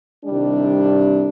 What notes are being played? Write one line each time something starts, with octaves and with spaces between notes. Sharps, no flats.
C2 C3 D#3 G3 D4